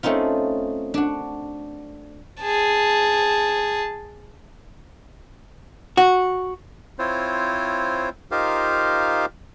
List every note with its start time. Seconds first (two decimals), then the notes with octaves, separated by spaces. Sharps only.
0.03 A3 C4 C#4 D#4 F4
0.94 D4 F#4
2.41 G#4 A5
5.97 F#4
6.99 C4 E4 F4 C5 C#5
8.31 D#4 F4 G4 A#4 C5 F5